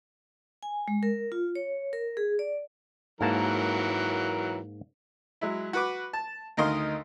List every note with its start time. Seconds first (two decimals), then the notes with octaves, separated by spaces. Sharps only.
0.63 G#5
0.88 G#3
1.03 A#4
1.32 F4
1.55 C#5
1.93 A#4
2.17 G#4
2.39 D5
3.21 G#2 E3 F#3 A#3 A#4 A5
5.41 F#3 G#3 E4
5.73 F#4 B4 D6
6.13 A5
6.57 D2 D#3 A#4 D#5 F5 C6